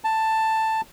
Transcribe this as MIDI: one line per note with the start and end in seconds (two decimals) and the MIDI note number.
0.04 0.81 81